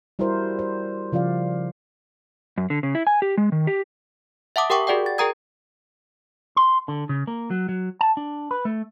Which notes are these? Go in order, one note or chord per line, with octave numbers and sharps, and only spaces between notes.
G3 E4 F#4 A#4 C5
C5
C#3 F3 F4 D5 F5
F#2
D3
C#3
E4
G#5
G4
G#3
D#3
G4
E5 F#5 A5 D6 D#6
G4 A#4 F#5 G5 C#6 D6
F#4 G#4 D5 F#5 G5
A6
G#4 A#4 G5 A#5 D#6 G#6
C6
D3
C#3
A#3
F#3
F#3
A5
D4
B4
A3